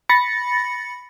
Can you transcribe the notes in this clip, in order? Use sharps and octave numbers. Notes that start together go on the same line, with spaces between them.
B5 A6 A#6 C#7